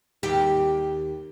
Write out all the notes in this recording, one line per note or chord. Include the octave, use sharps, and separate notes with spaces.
D#2 G4